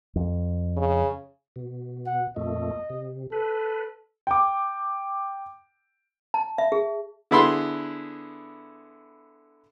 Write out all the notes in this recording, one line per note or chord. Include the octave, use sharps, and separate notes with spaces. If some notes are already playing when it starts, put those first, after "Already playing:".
F2
C#3
B2
F#5
F2 A#2 A3 D#5
C3
A4 B4
G5 D6
A5
E5
G#4
D3 B3 E4 G#4 B5 C6